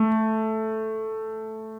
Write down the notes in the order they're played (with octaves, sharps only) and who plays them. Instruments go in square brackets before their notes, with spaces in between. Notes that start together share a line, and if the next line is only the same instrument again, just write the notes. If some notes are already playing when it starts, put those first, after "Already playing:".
Already playing: [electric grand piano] A3